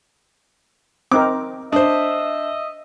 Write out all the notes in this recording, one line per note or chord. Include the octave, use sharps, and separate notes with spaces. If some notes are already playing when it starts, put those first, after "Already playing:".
C4 D#4 A#4 D6
D4 C5 D#5 E5